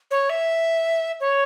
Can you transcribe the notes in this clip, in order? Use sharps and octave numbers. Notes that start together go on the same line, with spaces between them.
C#5
E5
C#5